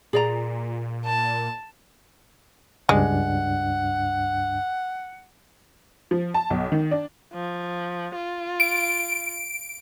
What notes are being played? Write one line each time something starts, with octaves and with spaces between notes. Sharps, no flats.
A#2 G#4 D5 A#5
A5
C#2 G2 G#3 D4 F#5
F3
A5
B1
D#3
D4
F3
F4
D7